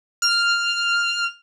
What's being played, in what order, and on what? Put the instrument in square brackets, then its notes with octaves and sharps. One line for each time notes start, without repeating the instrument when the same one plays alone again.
[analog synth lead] F6